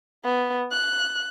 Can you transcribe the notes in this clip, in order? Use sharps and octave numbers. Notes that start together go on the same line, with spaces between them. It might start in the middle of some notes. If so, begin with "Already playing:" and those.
B3
F#6